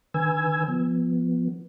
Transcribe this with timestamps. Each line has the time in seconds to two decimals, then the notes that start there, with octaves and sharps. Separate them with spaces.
0.14 D3 D#3 B4 G#5 E6 G#6
0.68 F3 B3